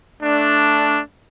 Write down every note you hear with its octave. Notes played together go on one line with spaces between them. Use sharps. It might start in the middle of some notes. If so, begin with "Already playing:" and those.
A3 D4